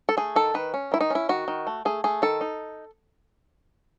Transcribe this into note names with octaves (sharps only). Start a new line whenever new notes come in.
A4
A3 G#4
D#3 A4
D#3 B4
C#4
D#3 E4
D#4
C#4 E4
D#3 F#4
D#3
A3
A3 G#4
A3 G#4
D#3 A4
D#4